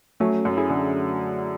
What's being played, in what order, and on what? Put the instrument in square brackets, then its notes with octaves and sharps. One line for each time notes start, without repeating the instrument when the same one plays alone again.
[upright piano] F#3 [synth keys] A3 C#4
[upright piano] F#2
[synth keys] E4 G#4
[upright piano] D3